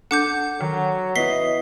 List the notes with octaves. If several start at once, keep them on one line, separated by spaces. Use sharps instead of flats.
D4 A4 F#5 D6 G6
D#3 F#3
B3 E4 D#5 B6 C7 G7